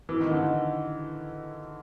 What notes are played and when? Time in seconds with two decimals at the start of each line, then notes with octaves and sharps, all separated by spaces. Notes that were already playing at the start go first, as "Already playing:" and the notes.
0.09 E3
0.20 D#3
0.31 D3
0.43 D#3